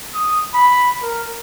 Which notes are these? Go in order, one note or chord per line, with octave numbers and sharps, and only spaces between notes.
D#6
B5
A#4